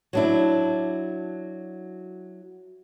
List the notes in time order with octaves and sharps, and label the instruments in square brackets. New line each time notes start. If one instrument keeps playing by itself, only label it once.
[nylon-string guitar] F#3 D4 E4